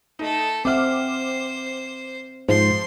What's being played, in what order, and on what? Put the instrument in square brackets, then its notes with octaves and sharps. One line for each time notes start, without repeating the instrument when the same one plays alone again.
[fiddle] A3 A4 [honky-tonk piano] D#4
[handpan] C4 E5 F#5 [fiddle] C5 [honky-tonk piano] D6 F6
[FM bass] G#2 [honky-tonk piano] F3 [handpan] C5 [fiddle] C6